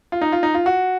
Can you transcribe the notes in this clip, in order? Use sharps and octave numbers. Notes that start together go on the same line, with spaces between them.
F4
D#4
F4
D#4
F4
F#4